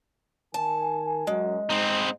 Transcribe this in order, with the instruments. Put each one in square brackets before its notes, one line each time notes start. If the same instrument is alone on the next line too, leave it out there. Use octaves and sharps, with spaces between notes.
[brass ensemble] D#3 A#4 G#5 [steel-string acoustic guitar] A5
[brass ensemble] F#2 F#3 [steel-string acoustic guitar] G#3
[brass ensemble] G#2 [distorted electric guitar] C4 D#4